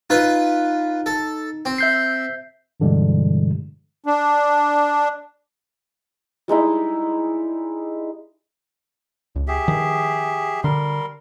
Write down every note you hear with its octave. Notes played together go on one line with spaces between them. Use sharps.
D#4 F4 B4
A4
C4
E5 G6 C7
G2 B2 D3 E3 G3 G#3
D4
G3 G#3 D#4 E4
C#2
G4 G#4 E5
D#3 F3
D3 G3 A#4 C6